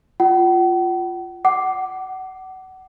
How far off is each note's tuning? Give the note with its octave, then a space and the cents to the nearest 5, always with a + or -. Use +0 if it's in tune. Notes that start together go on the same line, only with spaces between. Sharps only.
F4 +0 F#5 +45
F#5 +25 D6 +0